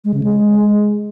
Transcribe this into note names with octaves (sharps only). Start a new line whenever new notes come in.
G#3
C#3
G#3